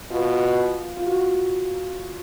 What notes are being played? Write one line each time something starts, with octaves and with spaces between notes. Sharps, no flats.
B2 F4
F4
F#4